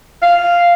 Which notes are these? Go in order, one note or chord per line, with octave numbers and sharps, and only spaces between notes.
F5